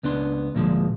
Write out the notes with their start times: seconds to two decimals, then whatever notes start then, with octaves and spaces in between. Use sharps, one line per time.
0.03 C#2 B3 D4 C6
0.55 D2 A#2 F3 G#3